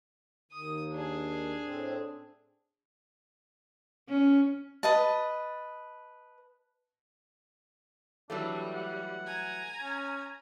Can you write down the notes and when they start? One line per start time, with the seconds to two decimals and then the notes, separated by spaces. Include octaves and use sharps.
0.51 D#2 D#6
0.92 D4 G#4
1.64 A2 C4
4.09 C#4
4.83 B4 D#5 A5
8.30 E3 F#3 G3 A3 D4
8.74 F#5
9.26 G#5 A#5
9.81 C#4